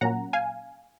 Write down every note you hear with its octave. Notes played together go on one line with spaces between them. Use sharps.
A#2 F#3 A#3 C#4 F#5 A#5
F5 G#5